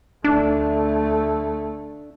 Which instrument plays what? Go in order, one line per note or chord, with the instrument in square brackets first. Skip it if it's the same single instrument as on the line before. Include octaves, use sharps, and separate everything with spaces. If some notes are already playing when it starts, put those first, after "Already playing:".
[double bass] D2 A3 [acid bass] D4